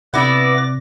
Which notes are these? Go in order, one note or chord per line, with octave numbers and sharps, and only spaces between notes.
C3 B3 E4 B4 D5 D6 A#6